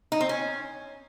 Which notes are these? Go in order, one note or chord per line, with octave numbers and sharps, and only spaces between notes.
D#4
C4
C#4